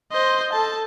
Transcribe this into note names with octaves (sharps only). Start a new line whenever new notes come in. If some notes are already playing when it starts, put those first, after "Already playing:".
C5 D#5
A4 A5